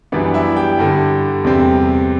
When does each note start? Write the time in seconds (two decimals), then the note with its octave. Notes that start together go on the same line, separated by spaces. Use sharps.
0.12 F#2 E3 G3 B3 D4 D5
0.34 E4 E5
0.57 G4 G5
0.79 G2 D3 G3
1.44 E2 C3 G3 C4